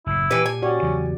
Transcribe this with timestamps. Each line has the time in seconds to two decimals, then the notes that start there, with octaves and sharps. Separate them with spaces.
0.06 F#1 A2 E4
0.31 A#2 E3 G4 B4
0.46 G#5
0.62 C#4 F#4 G4 D5
0.82 E2 C#3 F#3